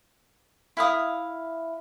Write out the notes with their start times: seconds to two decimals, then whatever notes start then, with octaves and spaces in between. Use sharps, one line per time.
0.77 E4 F5 D#6